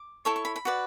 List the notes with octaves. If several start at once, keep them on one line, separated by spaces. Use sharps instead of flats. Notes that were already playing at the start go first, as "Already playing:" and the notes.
Already playing: D6
E4 A4 C#5 C#6
C#6
B5
B5
F#4 B4 D5